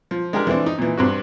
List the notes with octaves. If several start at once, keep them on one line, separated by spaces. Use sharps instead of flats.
F3
G#3 D4 G4 G#4 A#4
E3 A3 C4 D4
D#4
A#2 E3
G2 C4 F#4